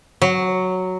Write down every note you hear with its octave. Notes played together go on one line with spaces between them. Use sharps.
F#3